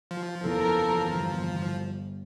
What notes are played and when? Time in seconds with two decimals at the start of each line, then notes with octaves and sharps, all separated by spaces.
0.11 F3
0.44 F#1 E2 E3 A4 A#4
1.10 G1